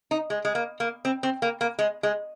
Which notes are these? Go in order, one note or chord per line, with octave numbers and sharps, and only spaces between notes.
D#4
G#3
G#3
A#3
A#3
C4
C4
A#3
A#3
G#3
G#3